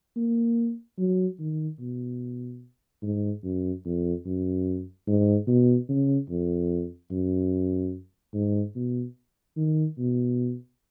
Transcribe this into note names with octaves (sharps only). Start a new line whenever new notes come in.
A#3
F#3
D#3
B2
G#2
F#2
F2
F#2
G#2
B2
C#3
F2
F#2
G#2
B2
D#3
B2